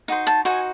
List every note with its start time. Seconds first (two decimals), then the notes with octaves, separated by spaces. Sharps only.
0.08 D#4 F#4 C5
0.27 A5
0.45 D#4 F#4 C5 G#5